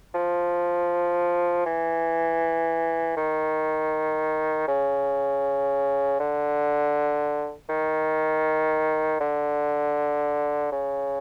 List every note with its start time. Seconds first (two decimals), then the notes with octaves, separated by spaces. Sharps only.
0.14 F3
1.66 E3
3.17 D#3
4.68 C#3
6.19 D3
7.69 D#3
9.20 D3
10.72 C#3